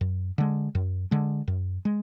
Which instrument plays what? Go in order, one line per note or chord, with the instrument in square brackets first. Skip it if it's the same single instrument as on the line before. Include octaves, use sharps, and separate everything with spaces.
[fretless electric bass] F#2
D3 G#3
F#2
D3 G#3
F#2
G#3